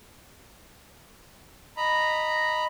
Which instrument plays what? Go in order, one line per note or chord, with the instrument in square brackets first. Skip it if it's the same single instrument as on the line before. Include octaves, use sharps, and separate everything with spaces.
[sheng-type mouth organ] D#5 A#5 B5